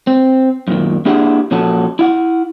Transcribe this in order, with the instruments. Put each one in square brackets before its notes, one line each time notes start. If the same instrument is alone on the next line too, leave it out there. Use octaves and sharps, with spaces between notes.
[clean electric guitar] C4
F#2 A#2 D#3
A#3 D4 E4 G4 G#4 F#5
A#2 F3 C#4 F#4 A4
E4 F5 F#5